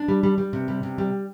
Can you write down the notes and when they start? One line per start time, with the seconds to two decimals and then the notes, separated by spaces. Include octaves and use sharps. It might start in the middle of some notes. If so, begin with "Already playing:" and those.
Already playing: D4
0.08 G3
0.23 G3
0.38 G3
0.53 C3
0.68 G3
0.83 C3
0.98 G3